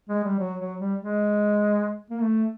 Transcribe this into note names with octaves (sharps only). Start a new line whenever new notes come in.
G#3
G3
F#3
F#3
G3
G#3
A#3
A3